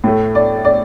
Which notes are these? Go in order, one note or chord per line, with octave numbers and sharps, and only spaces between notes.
A2 A3
D5
D5